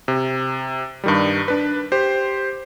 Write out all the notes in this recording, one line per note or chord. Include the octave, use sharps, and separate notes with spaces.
C3
G2 D#3 G3
D4 B4
G4 C5